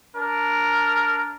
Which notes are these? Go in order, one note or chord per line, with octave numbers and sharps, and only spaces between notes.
D4 A#4